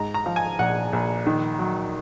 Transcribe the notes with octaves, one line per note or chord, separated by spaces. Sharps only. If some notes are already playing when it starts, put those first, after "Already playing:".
Already playing: G#2 A#5
A#5
F3
G#5
A#1 F#5
A#1
D#3
F#3